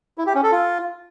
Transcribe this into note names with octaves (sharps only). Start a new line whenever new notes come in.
E4
G4
C#4
A4
F4